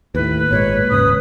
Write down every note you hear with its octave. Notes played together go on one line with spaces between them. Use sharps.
D#2 A2 B4
G#1 A#2 G#3 C#5
D#1 G#2 C#3 D#6